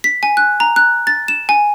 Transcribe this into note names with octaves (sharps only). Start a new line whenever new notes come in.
B6
G#5
F#6
A#5
F#6
A6
E7
G#5